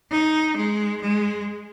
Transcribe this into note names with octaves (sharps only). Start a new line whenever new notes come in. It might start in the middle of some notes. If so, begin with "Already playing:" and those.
D#4
G#3
G#3